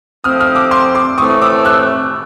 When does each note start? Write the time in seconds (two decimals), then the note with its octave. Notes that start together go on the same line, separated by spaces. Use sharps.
0.24 F3 A3 C4 D#6 F6
0.40 D#6 F6
0.55 D6 E6
0.71 C6 D6
0.95 C6 D6
1.18 A2 E3 A3 C4 C#6 D#6
1.41 D6 E6
1.65 E6 F#6